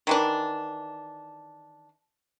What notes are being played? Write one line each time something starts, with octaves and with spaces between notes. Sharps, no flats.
D#3 E3 D4